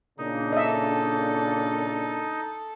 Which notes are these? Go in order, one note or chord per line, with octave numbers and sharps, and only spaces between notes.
A#2 C#3 D4 D#4
A4 D#5 E5